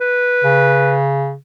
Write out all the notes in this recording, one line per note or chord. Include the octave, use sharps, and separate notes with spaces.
B4
C#3